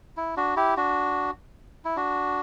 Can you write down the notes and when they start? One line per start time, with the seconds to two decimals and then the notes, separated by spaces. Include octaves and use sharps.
0.17 E4
0.37 D4 F#4
0.56 E4 G4
0.77 D4 F#4
1.85 E4
1.96 D4 F#4